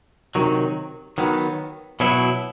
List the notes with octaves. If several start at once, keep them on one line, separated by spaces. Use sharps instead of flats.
C3 D#3 F#3
D#3 F#3 B3
B2 F#3 B3 E4